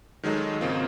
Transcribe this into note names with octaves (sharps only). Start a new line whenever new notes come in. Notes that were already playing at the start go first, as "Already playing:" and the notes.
D#3 F#3 G#3 D#4 A4
G#1 C#3 A#3 C4 F4